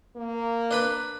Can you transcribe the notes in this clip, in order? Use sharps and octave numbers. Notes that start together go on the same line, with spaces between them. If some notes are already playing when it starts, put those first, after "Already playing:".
A#3
D4 B4 B5